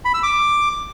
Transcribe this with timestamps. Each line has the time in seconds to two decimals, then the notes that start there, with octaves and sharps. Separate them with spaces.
0.05 B5
0.14 E6
0.23 D6